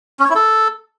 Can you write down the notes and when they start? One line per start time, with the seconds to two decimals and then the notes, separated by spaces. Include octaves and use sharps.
0.20 C#4
0.25 C#5
0.30 E4
0.35 A4